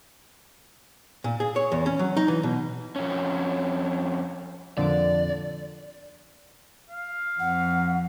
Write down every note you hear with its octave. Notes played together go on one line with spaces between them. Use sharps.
A#2
G#4
C#5
E2
C#4
F#3
D#4
E3
B2
F2 C#4
F2 A#2 D3 D5
F5
F2 F#5